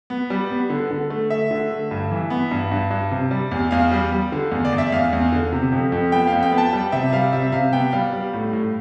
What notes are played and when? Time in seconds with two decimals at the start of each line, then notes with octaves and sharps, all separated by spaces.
0.10 B3
0.30 G3
0.50 B3
0.70 D3
0.91 D3
1.10 A3
1.30 A3 E5
1.51 D3
1.71 A3
1.91 G2
2.11 E3
2.30 B3
2.51 G2
2.71 G2
2.91 G2
3.11 C3
3.31 G3
3.51 E2
3.71 E2 F5
3.91 G3
4.12 G3
4.32 D3
4.51 E2
4.65 D5
4.72 E2
4.78 E5
4.92 E2 F5
5.13 E2
5.32 D3
5.53 C3
5.72 F2
5.92 F2
6.12 B3 G5
6.27 F2 F5
6.43 G5
6.52 B3
6.58 A5
6.73 G3 G5
6.92 C3 E5
7.12 G3 F5
7.33 C3 E5
7.44 E5
7.52 C3 F5
7.73 B3 G5
7.92 G3 F5
8.13 G3
8.34 A2
8.53 A2